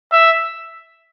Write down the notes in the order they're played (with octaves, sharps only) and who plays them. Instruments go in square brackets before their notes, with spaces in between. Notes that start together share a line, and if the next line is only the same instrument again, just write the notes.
[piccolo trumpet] E5